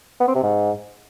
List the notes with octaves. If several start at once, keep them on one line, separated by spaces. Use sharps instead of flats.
B3
C4
C3
G#2